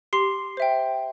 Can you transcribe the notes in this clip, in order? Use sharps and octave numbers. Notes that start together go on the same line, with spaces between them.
G4 C6 C7
C5 E5 G5